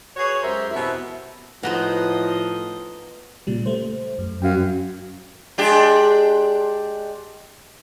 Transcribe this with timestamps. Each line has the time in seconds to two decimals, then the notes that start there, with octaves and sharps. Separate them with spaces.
0.17 F#4 G#4 B4 C#5
0.42 F#2 G#3 G4 A#4 C5 E5
0.71 E2 B2 C4 E4
1.63 A2 F3 B3 D#4 F#4 C5 D#5
3.47 A#2 C#3 G3
3.66 A3 C5
4.19 F#2
4.42 F#2 F5 G5
5.58 G#3 D4 G4